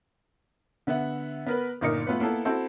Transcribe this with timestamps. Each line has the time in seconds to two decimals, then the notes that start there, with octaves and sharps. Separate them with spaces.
0.87 D3 B3 E5 F#5
1.46 B3 A#4 B4
1.81 G1 A#2 D#4 A#4 C#7
2.07 A3 B3 F4 B4
2.20 A#3 B3 E4 A4
2.45 C4 E4 F#4 A4 C5